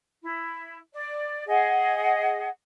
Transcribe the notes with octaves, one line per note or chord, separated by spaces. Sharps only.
E4
D5
G#4 D#5 F#5